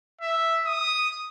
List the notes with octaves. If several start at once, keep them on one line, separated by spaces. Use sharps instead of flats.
E5
D#6